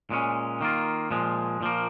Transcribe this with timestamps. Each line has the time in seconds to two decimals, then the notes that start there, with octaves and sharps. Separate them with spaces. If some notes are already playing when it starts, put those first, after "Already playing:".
0.10 A#2 G#3 C#4
0.61 D#3 A#3 F4
1.11 A#2 F3 G#3
1.61 A#2 F3 A#3